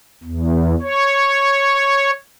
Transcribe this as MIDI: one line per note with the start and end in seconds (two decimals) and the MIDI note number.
0.24 0.75 40
0.82 2.11 73